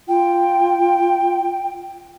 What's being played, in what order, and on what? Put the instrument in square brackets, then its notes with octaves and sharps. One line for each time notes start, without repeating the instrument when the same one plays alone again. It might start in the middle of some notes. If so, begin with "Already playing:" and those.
[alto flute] F4 [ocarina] G5